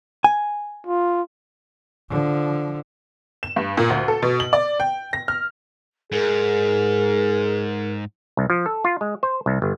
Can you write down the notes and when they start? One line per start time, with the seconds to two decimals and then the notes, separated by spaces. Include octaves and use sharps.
0.24 G#5
0.87 F4
2.09 D3 F3
3.43 E7
3.56 G2
3.77 A#2
3.90 D2
4.08 A4
4.22 B2
4.40 F#7
4.53 D5
4.80 G5
5.13 A#6
5.28 F6
6.12 G#2 G#4 A#4
8.37 C2
8.50 F3
8.66 A4
8.84 F4
9.01 G#3
9.23 C5
9.46 C2
9.62 G1